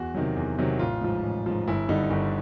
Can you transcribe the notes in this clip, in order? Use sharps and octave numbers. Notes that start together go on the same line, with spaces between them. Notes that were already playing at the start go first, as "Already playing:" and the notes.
Already playing: E2 F#4
C3 D#3 F#3
E2
C3 D#3 F#3
A1 F4
G#2 F3
A1
G#2 F3
G1 E4
G2 D3 G3 D#4
G1